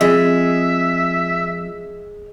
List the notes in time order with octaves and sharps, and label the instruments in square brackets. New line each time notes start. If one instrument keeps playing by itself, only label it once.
[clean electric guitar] F2 [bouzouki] G#3 [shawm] E5